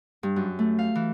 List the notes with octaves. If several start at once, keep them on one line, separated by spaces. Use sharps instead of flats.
G2
F#2
A3
F5
E3